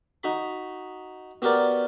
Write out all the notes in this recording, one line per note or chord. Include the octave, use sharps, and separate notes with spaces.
D#4 F#4 B5
B3 F#4 G4 A#4 D5